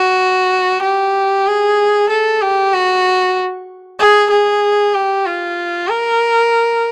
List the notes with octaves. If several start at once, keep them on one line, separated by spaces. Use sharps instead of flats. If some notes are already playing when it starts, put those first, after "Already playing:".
Already playing: F#4
G4
G#4
A4
G4
F#4
G#4
G#4
G4
F4
A#4